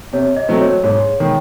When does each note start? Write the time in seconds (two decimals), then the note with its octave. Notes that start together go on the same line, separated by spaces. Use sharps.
0.13 C3 C#5
0.36 D#5
0.48 F#3 A3 C4
0.61 C#5
0.84 G#2 C#5
1.20 D#3 G#3